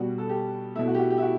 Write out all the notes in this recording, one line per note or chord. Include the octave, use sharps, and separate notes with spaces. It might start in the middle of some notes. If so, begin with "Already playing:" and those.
Already playing: B2 G3 F#4
A4
G4
B2 A3 E4
F#4
G4
F#4
G4
E4
F#4